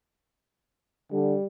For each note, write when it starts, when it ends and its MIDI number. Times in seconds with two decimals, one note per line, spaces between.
1.12 1.36 50
1.12 1.47 55